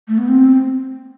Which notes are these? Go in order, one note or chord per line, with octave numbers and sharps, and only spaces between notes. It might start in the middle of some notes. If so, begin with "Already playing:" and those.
A3
B3
C4